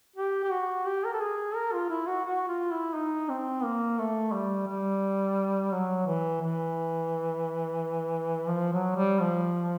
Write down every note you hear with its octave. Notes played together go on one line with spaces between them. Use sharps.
G4
G4
F#4
G4
A#4
A4
G#4
A#4
F4
E4
F#4
F#4
F4
E4
D#4
C4
A#3
A3
G3
G3
F#3
E3
E3
F3
F#3
G3
F3